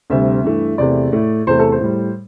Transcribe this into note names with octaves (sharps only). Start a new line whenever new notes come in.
D2 C3 G3 E5
G2 E3 A3
E2 C3 A3 D5
A2 A3
E2 C3 A3 C5
A4
C5
A2 G3